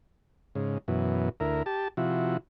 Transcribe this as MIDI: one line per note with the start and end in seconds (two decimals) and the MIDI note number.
0.55 0.78 44
0.55 0.78 49
0.88 1.29 42
0.88 1.29 47
0.88 1.29 52
1.40 1.63 38
1.40 1.63 64
1.40 1.63 70
1.66 1.88 67
1.66 1.88 81
1.97 2.37 48
1.97 2.37 53
1.97 2.37 64
1.97 2.37 66